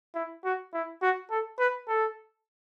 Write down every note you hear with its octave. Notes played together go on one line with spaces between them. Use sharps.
E4
F#4
E4
F#4
A4
B4
A4